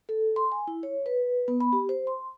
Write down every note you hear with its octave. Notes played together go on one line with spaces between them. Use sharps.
A4
C6
G#5
E4
C#5
B4
B3
B5
G4
C5
C6